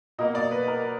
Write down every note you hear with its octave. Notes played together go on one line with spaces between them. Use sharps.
B2 A#3 D#5
D5
B4
A#4